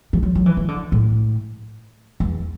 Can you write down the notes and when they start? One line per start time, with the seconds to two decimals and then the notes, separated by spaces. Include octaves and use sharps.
0.13 E3
0.23 F#3
0.35 F#3
0.46 E3
0.57 E3
0.68 D3
0.92 A2
2.20 E2